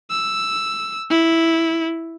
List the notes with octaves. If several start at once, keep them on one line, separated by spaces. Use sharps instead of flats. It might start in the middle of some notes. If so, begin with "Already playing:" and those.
E6
E4